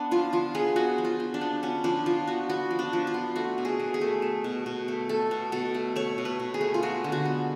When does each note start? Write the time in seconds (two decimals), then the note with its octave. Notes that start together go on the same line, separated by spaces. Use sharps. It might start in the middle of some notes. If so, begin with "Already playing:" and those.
Already playing: B3 D4
0.11 F3 F4
0.33 F3 F4
0.55 B3 G#4
0.76 B3 F#4
0.98 F3
1.05 F4
1.20 F3
1.34 D4
1.41 B3
1.63 B3 C#4
1.84 F3 D4
2.06 F3 F4
2.27 B3 F#4
2.50 B3 F#4
2.71 F3
2.79 D4
2.93 F3
3.07 F4
3.14 B3
3.36 A3 F#4
3.58 B2
3.65 G#4
3.80 B2
3.94 G#4
4.01 A3
4.22 A3
4.44 B2
4.66 B2
4.88 A3
5.09 A3 A4
5.31 B2
5.52 B2 A4
5.74 A3
5.96 A3 C#5
6.18 B2
6.25 B4
6.40 B2
6.54 G#4
6.61 A3
6.74 F4
6.82 G#3 F#4
7.04 D3
7.12 F#4
7.25 B3